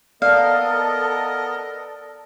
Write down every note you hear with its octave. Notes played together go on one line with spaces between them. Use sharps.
B3 A4 A#4 D5 D#5 F5